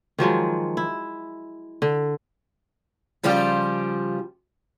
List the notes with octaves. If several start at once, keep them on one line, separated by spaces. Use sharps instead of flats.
D#3 F3 F#3 G#3
E4
D3
C#3 F3 G3 F4 G4